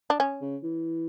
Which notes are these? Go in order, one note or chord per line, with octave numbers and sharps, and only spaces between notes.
D4
C#4
C#3
E3